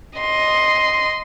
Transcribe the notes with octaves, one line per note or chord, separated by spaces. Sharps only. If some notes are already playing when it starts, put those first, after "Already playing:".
D#5 C6